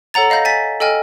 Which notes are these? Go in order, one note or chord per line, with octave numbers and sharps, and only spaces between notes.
A4 C#5 F#5 A#5 A6
D#5 F5 B5 G6 A#6
G#5 A6 B6
A4 D#5 G5 G#5 F6